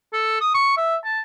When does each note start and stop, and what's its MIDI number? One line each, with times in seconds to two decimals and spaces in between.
0.13 0.37 69
0.41 0.54 87
0.55 0.73 85
0.77 0.96 76
1.05 1.21 81